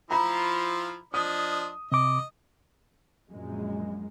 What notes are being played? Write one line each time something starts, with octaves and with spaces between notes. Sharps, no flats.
F3 E4 F4 A#5 B5
F3 D4 D#5 D#6
C3 D#5 D6
A#1 F#2 G#3